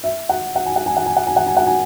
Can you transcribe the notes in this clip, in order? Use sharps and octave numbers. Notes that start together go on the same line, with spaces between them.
E5
F#5
F#5
G#5
F#5
G#5
F#5
G#5
F#5
G#5
F#5
G#5
F#5
G#5